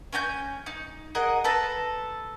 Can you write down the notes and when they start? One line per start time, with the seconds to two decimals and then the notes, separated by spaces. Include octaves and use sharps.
0.13 C#4 G#5 A5 G6
0.66 D#4
1.15 G#4 A#4 D#5 F#5
1.44 A4 B4 A5 A#5